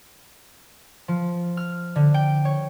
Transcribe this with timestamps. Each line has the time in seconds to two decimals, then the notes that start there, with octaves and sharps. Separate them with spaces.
1.08 F3
1.57 F6
1.96 D3
2.14 G5
2.45 C#5